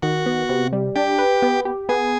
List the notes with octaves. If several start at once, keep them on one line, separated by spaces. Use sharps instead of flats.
D#3 F#4
B3
C3
G3
D4 G4
B4
B3
G4
B3 G#4